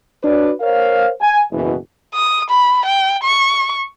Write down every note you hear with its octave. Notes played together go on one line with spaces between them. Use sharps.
D4 F#4 B4 C#5 D5
A#4 C5 C#5 F5
G#5
F#1 B2 E3
D#6
B5
G5
C#6